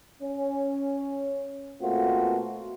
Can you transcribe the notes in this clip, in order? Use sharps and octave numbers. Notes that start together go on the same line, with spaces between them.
C#4
B2 A3 A#3 C4 F4 F#4